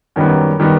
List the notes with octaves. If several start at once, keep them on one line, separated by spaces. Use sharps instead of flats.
F#2 D#3 G3 B3
D#3 G3 B3